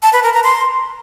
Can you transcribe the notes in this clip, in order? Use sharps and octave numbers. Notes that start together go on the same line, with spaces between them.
A5
B4
A#4
A#5
C6